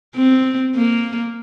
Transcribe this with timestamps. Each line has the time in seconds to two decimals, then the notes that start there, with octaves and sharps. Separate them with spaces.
0.16 C4
0.75 A#3